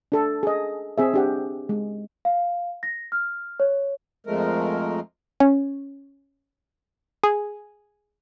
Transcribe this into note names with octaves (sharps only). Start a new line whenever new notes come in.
D4 A4
G#4 D#5
C4 G#4 E5
D4 G4 F#5
G#3
F5
A#6
F6
C#5
F2 F3 G#3 A3 A#4
C#4
G#4